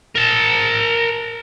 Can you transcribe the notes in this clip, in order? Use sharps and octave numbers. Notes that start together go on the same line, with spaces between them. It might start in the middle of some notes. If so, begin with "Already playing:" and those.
A#4 A5